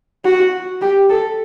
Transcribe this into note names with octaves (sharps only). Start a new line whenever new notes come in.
F#4
G4
A4